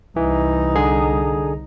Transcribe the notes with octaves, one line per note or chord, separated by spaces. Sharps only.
C2 E3 D#4
D3 G#4